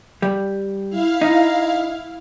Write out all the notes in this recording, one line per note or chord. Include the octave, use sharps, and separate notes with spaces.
G3
E4 F5
D#4